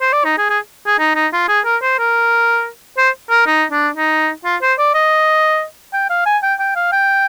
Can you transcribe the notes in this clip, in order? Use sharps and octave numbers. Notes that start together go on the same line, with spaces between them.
C5
D5
D#4
G#4
G#4
G#4
D#4
D#4
F4
G#4
A#4
C5
A#4
C5
A#4
D#4
D4
D#4
F4
C5
D5
D#5
G5
F5
G#5
G5
G5
F5
G5